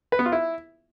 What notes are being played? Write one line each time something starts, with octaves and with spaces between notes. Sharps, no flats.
B4
B3
F4
E4